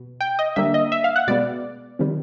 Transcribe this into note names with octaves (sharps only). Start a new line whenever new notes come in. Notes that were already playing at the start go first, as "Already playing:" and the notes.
Already playing: B2
G5
D#5
D3 G3 A#3 E5
D#5
E5
F5
F#5
B2 G#3 B3 D5
C3 D#3 G3